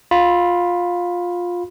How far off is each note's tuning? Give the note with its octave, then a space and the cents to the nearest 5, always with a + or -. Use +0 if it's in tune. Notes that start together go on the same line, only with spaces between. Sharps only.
F4 +15 B5 +0